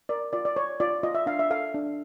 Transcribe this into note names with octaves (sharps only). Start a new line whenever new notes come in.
A#4 D5
F4 D5
D5
C#5
F4 D5
F4 D#5
E5
D4 F5
E5
A4 F5
D4